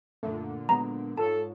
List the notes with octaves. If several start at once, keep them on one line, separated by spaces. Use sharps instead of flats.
F#2 A#2 D3 A3
F#3 G#3 B3 A#5
G#2 F4 A4 C#5 A5